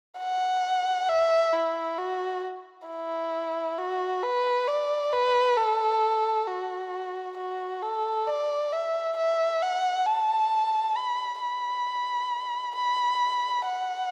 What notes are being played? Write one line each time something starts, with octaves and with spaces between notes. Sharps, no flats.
F#5
E5
E4
F#4
E4
F#4
B4
D5
B4
A4
F#4
F#4
A4
D5
E5
E5
F#5
A5
B5
B5
B5
F#5